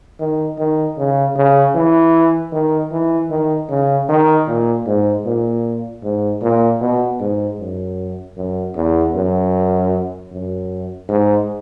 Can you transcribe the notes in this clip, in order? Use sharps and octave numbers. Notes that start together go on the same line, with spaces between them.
D#3
D#3
C#3
C#3
E3
D#3
E3
D#3
C#3
D#3
A#2
G#2
A#2
G#2
A#2
B2
G#2
F#2
F#2
E2
F#2
F#2
G#2